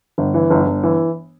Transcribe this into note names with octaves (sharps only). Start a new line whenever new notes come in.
G1
E3
G1
G1
E3